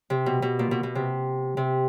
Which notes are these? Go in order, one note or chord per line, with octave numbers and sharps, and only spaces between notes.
C3
B2
B2
A#2
B2
B2
C3
C3